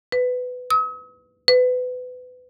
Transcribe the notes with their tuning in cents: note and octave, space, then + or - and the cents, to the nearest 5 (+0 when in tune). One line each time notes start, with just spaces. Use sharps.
B4 +15
D#6 +45
B4 +25